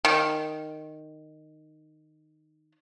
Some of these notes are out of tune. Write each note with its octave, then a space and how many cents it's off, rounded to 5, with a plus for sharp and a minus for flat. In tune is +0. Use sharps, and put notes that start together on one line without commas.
D#3 -10